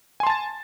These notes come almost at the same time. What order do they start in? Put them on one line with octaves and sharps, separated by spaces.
G#5 C6 A5 A6